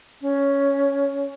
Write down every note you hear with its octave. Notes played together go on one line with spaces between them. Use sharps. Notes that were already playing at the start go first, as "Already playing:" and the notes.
C#4